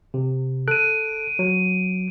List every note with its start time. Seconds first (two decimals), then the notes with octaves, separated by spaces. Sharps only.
0.14 C3
0.68 A4 F#6 D7 D#7
1.39 F#3